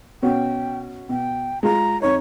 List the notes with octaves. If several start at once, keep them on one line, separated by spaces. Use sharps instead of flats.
B2 C#4 F#4 G5
B2 G5
G#3 F4 A#5
F2 D#4 C#5